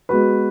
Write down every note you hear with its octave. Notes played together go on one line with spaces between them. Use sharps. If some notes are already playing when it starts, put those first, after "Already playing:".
G#3 B3 F#4 B4